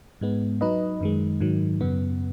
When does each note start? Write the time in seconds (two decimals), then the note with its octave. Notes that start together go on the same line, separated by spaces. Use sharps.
0.21 G#2 G#3 B3
0.61 F#3 D#4 B4 D#5
1.01 F#2 D#3 G#3
1.41 G#2 D#3 F#3
1.81 F#2 C#3 B3